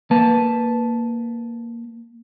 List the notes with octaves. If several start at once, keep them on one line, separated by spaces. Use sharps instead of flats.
A#3 B4 A5